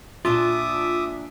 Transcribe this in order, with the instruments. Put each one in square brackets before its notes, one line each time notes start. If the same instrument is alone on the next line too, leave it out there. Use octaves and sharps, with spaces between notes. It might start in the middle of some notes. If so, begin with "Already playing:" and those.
[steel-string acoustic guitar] A#2 D4 A5 [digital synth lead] F4 [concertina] E5 D6 D#6